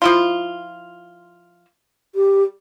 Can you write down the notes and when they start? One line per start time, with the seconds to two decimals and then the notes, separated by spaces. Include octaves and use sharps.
0.02 F3 E4 F4
2.15 G4